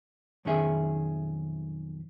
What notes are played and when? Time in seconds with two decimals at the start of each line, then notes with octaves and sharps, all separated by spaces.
0.45 B1 F2 D#3 C#4 G#4 E5